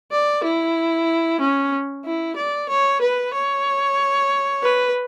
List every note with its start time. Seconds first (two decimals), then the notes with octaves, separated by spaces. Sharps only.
0.12 D5
0.43 E4
1.40 C#4
2.05 E4
2.36 D5
2.69 C#5
3.01 B4
3.33 C#5
4.63 B4